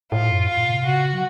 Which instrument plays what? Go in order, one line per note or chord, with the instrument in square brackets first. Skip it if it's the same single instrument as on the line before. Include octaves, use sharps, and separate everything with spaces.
[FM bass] A2 [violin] F4
[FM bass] F#2
[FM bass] A2 [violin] F4
[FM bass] A#2
C3
[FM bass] C#3 [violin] F#4
[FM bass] F#3